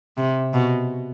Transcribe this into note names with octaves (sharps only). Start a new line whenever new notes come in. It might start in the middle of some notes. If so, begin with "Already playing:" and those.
C3
B2